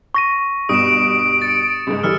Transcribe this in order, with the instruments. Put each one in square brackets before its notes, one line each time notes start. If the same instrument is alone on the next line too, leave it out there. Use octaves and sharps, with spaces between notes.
[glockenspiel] C#6 A#6 D#7
[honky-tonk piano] G2 B2 [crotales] D#6 E7 [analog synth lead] D7
[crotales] A6 C#7
[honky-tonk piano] C#2 G#2
[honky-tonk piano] D3 E3 G3 [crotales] E6 F6 C#7